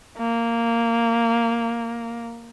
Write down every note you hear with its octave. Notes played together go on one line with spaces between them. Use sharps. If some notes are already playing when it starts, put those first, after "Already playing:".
A#3